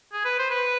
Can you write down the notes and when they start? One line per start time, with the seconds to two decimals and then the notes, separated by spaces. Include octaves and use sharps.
0.13 G#4
0.25 B4
0.39 C5
0.51 B4